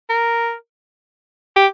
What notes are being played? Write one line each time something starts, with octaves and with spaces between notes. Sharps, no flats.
A#4
G4